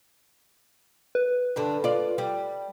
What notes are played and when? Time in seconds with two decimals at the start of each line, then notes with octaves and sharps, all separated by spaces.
1.15 B4
1.56 G2 D3 D4
1.84 F4 D5
2.18 G3